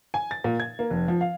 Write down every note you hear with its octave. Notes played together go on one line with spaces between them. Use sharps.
G#5
A6
A#2
G#6
A#3
F1
F3
F5